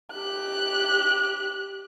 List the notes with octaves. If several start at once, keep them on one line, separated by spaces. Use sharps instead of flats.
G4 F#6